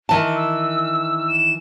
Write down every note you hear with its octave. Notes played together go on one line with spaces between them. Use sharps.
D#3 E3 A5
E6
E7